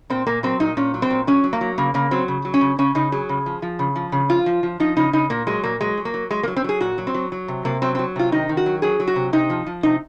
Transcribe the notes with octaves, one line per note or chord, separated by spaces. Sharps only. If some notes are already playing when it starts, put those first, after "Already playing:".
A#2 C4
A#2 A#3
F#3 C4
A#2 D#4
A#2 C#4
F#3
C4
A#2
F#3 C#4
F#3
A#3
F#3
C#3 A#3
C#3 A#3
F#3 C4
C#3
F#3
C#4
C#3
C#3 C#4
C#3 D#4
F#3 G#4
C#3
F3
F3
C#3
F3
C#3
F3 F4
F3
F3
F3 D#4
C#3 D#4
C#3 D#4
A#2 A#3
F#3 G#3
A#2 A#3
F#3 G#3
F#3
A#3
F#3
F#3 G#3
A#3
F#3
C4
F#3 G#4
A#2 F#4
F#3
C4
F#3
F#3
C3
C3 A#3
F#3 C4
C4
F#3
C3 F4
D#3 D#4
D#3
F#4
F#3
F#3 G#4
F#3
F#4
C3
C3 D#4
F3
F3
C3 D#4